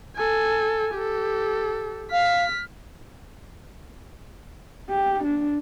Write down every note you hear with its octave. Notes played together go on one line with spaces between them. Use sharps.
A4 G#5
G4 A4
F5 F6 B6
G4
D4